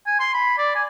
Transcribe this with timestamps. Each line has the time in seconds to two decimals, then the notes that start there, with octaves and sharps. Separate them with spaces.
0.06 G#5
0.20 C6
0.34 B5
0.58 D5
0.75 G#5